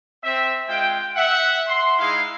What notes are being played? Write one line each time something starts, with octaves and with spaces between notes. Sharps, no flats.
C4 E5
G#3 F4 G5
E5 F#5
C6
G#3 D#4 E4 G#4 F5